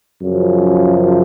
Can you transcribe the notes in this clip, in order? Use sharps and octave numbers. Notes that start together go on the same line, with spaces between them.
F#2 C#3 F3